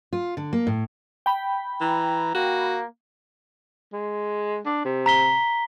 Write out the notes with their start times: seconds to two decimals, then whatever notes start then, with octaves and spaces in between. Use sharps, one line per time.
0.13 F4
0.37 D3
0.53 A#3
0.67 A2
1.26 G5 B5
1.81 E3 A#5
2.35 A#3 F#4
3.93 G#3
4.66 D4
4.85 C3
5.06 A#5 B6 G7